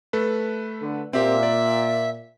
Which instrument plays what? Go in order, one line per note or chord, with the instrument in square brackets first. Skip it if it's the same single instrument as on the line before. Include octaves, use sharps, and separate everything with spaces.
[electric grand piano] A3 A4 B4
[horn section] D3
[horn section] A#2 [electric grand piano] C4 G4 [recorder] E5
[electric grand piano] D5